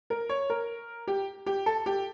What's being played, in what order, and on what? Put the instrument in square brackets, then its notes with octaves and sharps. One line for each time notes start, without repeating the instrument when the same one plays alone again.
[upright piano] A#4
C#5
A#4
G4
G4
A4
G4